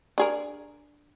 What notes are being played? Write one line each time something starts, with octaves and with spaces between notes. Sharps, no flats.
D4 G#4 A#4